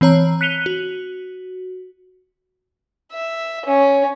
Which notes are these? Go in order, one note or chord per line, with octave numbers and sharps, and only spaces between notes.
E3 C4 C#5 A#5
F#6 B6 C#7 D#7 F7 G7
F#4
E5
C#4